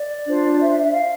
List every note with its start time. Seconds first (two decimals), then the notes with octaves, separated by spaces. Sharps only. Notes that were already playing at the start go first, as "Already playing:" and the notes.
Already playing: D5
0.26 D4 F4 C5
0.59 E5
0.71 E5
0.81 E5
0.92 F5